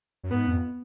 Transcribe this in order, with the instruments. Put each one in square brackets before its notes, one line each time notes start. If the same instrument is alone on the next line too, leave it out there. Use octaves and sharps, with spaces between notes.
[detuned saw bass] F#2
[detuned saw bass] G#2 [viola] B3
[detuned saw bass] F2